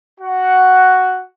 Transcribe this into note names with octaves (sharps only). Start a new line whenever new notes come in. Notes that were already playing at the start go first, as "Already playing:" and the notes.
F#4 F#5